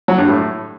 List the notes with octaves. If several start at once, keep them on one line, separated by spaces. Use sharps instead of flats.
F#3
G2
A2